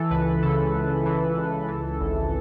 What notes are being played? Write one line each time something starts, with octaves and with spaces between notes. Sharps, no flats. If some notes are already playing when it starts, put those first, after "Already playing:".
Already playing: E3 A4
C#2 B4
C#3 A4
C#2
E3
C#2
E3
G#1